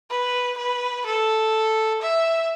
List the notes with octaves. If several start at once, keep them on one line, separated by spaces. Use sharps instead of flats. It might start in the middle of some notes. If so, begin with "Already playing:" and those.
B4
B4
A4
E5